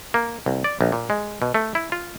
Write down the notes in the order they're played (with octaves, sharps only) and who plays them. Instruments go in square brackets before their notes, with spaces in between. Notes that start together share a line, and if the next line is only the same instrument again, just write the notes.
[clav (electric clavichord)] A#3
C2
D5
A#1
A#2
G#3
B2
A3
E4
F4